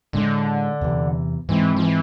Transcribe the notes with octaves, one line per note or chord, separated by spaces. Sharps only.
A2 D3 G#3 D4
E2 C3 E3
G#2 E3 G#3 C4
F3
E3